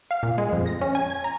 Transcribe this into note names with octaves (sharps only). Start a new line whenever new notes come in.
F5
A#2
G#3
F2
A#6
C#4
G#5
G#6
A#5